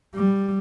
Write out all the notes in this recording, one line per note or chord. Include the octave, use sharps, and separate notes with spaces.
G3